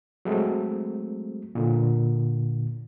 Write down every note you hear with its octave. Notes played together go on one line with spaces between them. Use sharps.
F#3 G#3 A3 C4
A#2 D3